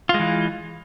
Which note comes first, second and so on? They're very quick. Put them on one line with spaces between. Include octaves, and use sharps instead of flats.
F4 G#3 E3